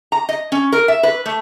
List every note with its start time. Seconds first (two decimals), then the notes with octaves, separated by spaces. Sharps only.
0.12 A#5
0.29 D#5
0.52 C#4
0.72 A#4
0.88 E5
1.03 B4
1.26 A3